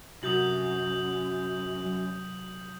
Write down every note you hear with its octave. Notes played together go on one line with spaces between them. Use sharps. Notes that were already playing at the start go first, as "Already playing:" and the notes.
F#2 C3 F#4 D#6 G6 F#7
F#3